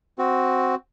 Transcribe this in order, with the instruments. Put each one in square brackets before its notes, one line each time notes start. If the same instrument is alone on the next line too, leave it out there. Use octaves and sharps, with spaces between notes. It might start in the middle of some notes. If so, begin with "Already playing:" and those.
[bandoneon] C4 F#4